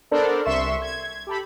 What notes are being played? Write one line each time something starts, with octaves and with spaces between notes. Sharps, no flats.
B3 D4 A4 A#4 C5 D5
C2 E5 C6 C#6 E7
G#6
G4 A4 B5